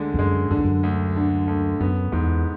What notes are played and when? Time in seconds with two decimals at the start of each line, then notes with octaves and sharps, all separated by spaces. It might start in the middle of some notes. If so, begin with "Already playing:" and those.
Already playing: D2 D3 G#3
0.14 E2
0.19 F#2 G#3
0.51 F#2 D3
0.58 E2
0.65 F#2
0.83 D2
1.16 D3
1.48 D2
1.81 F#2 B3
2.12 E2 G#2